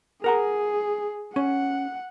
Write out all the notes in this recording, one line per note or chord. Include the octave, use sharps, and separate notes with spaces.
G#4 A#4 F#5 A#5
C#4 F#5